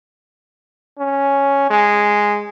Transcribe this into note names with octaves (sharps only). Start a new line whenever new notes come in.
C#4
G#3